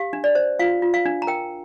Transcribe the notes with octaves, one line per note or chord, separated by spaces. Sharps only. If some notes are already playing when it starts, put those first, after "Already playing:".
Already playing: G4 F5
D4
D5
C5
F4 F5
F4
F5
D4
A#5
A#4 G5